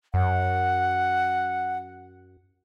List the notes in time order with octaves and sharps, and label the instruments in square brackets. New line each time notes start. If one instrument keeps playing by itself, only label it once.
[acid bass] F#2 [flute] F#5